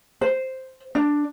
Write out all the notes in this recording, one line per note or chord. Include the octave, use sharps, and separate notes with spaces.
C5
D4